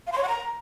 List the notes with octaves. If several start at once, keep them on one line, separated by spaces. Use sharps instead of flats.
F5
C6
C#5
F#5
A#5